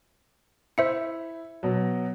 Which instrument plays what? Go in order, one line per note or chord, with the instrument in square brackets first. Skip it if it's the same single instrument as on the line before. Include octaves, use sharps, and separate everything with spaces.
[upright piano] E4 [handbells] C5 E5 C#7
[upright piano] B2 F#3